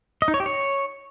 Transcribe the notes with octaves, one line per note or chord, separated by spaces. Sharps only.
D#5
D#4
C#5
G4
C#5